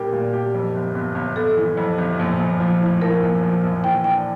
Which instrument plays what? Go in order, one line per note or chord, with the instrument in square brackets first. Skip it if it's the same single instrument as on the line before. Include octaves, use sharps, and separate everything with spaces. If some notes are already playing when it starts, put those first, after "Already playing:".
Already playing: [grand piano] A#2 G3 D4 G4 [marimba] A#4
[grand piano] A#2
G4
F2
G1
G1
G1
[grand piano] G1 [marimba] A4
[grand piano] E3
F2
G1
A#1
A#1
F3
A2
[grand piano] F3 [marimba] A#4
[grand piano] A#1
F3
A#1
[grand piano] E3 [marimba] G5
[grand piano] D4 [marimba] G5